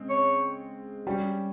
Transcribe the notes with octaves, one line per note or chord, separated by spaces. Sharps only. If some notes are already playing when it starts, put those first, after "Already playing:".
Already playing: C#3 G#3 C4
C#5
G3 C#4 G4